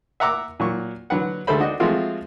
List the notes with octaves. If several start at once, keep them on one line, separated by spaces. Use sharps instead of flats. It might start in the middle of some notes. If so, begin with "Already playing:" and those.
E5 F#5 A#5 D6 E6
A#2 F#3 C#6
D3 F#3 B4 F#5
D2 G#3 A3 A4 C5 B5
D4 D#4 F#4 D#5
F3 G#3 A3 C4 F4 F#4